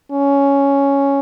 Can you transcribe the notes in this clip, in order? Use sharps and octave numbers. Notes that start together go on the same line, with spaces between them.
C#4